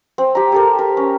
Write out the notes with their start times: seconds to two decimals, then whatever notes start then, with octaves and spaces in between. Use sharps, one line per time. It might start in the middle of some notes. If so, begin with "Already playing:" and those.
0.18 C4
0.35 G4 A#5
0.52 G4 A4 A#4
0.79 A#4
0.97 C#4